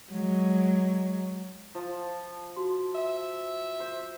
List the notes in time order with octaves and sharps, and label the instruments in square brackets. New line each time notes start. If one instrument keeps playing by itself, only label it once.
[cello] F#3 G#3
[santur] F3
[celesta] F#4 C6
[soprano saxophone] E5
[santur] C5